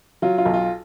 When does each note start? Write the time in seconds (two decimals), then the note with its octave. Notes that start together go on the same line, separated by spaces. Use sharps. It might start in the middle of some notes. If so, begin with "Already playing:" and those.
0.22 F#3 F4
0.38 F4
0.46 B1
0.54 F4